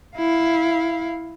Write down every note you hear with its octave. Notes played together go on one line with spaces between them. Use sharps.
E4 F5